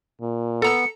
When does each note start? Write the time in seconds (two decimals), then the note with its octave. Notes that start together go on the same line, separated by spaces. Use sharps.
0.21 A#2
0.62 B3 A4 A#5 E6 C#7